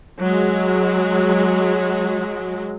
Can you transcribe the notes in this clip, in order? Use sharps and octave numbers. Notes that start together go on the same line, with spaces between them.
F#3 G#3